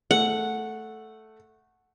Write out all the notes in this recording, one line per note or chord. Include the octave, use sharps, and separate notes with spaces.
A3 F#5